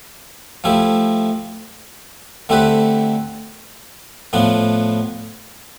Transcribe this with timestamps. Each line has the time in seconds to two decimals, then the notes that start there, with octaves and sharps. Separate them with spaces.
0.64 F3 A3 E4 G4
2.49 D3 A3 C4 G4 B4
4.33 A2 F3 B3 D4